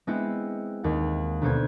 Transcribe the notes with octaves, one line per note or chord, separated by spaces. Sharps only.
G#3 B3 C4 E4
D#2 F#5
D2 B2 B3 C5 G6 G#6